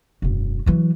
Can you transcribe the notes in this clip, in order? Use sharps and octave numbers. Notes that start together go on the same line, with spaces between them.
E1 F#2
E3 F#3